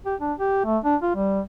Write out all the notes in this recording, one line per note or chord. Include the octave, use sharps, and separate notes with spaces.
G4
D4
G4
A3
D4
F4
G3